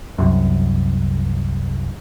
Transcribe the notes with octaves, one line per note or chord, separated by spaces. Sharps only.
C2 F#2